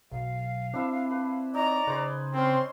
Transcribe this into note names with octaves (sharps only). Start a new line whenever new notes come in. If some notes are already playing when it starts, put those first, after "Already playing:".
B1 F5
C4 D4 E4 E5
B4
D#4 C#5 D5 A#5
C#3 B4 C5 G#5
C4 C#4 C5 C6